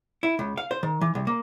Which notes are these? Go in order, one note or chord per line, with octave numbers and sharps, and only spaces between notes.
E4
C#2
F5
C5
D#3
E3
C2
A#3